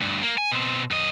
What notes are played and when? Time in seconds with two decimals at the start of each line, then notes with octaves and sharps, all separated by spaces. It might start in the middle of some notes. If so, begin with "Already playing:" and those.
0.01 D2 G2
0.22 A#3
0.38 G#5
0.51 B2 C4
0.91 F#2 D#5